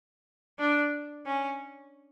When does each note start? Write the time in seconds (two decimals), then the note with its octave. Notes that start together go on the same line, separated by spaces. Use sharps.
0.59 D4
1.26 C#4